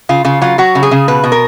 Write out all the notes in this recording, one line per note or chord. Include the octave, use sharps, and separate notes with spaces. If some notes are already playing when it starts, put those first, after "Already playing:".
C#3 F4
C#3 F4
F#3 F4
F#3 F#4
C#3
G#4
C#3
B2 B4
B2
A#4